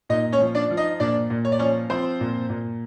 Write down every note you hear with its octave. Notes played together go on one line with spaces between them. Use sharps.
A#2 D#4 D#5
C#4 C#5
F3
D4 D5
F3
D#4 D#5
A#2 D4 D5
A#2
C#5
D5
F3 C#4 C#5
F3 C4 C5
A#2
A#2